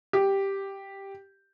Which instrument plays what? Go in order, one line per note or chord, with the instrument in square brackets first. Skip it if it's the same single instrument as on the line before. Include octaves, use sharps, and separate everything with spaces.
[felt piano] G4